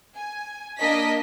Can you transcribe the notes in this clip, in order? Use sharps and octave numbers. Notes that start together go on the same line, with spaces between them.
G#5
A#3 D4 D#5 B6